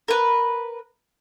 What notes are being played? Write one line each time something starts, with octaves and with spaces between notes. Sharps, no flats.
A#4 B4